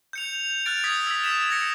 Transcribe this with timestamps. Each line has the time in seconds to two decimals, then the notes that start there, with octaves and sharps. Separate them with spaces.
0.13 G6 C#7 F7
0.66 F6 F#6 A6 D7
0.84 D#6 G#6 B6
1.07 E6 B6
1.24 E6 B6 E7
1.50 G#6 A#6 C#7